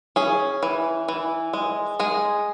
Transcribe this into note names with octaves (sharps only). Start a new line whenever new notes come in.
C#4 G#4
E3
E3
G#3
G#3 G#4